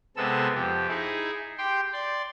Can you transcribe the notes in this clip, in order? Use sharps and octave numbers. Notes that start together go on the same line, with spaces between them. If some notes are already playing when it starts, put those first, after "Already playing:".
C3 G#3 B3 A4 E6
F2 G4
D#4 E4 G#4
G4 G5 C6
D5 C6